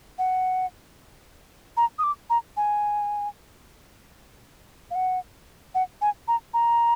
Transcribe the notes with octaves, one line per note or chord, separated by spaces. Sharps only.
F#5
A#5
D#6
D6
A#5
G#5
F5
F#5
F#5
G#5
A#5
A#5